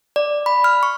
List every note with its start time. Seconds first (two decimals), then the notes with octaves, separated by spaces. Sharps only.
0.16 D5
0.46 B5
0.64 F6
0.83 C#6